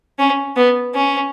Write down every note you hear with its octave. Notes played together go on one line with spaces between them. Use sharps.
C#4
B3
C#4